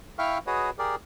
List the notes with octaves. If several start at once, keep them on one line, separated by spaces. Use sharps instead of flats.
E4 E5 F5 G5 C#6 F6
F#4 G#4 B4 C#5 D#5
G4 G#4 A#4 D5